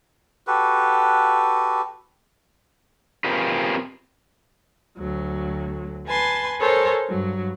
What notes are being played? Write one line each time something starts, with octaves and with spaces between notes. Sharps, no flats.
F#4 G4 A4 B4
C4 F4 G4 G#4 A#4 B4
D2 F#3
B4 G#5 A5 C6
A4 A#4 C5 C#5 G#5
G2 F#3